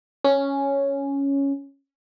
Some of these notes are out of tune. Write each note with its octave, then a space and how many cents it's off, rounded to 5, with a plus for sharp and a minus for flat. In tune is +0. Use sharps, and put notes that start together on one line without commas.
C#4 +0